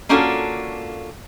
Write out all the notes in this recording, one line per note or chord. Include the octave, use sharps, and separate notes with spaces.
A#3 C#4 D4 F4 F#4 A4